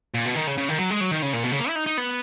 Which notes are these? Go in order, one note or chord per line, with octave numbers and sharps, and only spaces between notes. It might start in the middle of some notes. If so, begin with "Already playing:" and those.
A#2
B2
D#3
C#3
C#3
D#3
F#3
G#3
F#3
D#3
C#3
A#2
B2
C#3
A#3
E4
D#4
D#4
B3